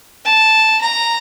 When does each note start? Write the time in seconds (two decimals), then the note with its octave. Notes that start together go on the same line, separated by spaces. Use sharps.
0.25 A5
0.80 A#5